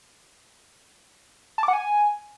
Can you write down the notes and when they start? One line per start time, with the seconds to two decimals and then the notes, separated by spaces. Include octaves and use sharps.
1.58 A5
1.63 D6
1.68 F#5
1.73 G#5